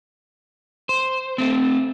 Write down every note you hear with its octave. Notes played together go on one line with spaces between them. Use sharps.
C5
A3 C4